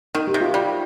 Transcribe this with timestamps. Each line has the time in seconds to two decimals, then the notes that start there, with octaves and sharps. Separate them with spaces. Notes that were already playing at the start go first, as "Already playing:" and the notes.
0.15 D#3 D#4
0.27 G4
0.34 C3
0.41 F4
0.54 G3